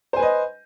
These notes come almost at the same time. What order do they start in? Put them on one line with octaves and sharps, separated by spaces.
C5 G#5 B4 D#5